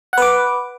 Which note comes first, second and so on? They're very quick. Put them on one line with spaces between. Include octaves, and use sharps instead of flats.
F#5 B4 D6